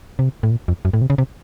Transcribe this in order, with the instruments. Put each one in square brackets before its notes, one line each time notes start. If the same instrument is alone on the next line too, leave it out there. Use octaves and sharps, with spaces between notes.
[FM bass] C3
A2
A#2
F2
F#2
A2
C3
C#3
C3